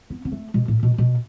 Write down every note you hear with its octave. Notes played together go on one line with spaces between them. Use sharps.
B3
B3
A3
B2
A2
B2
B2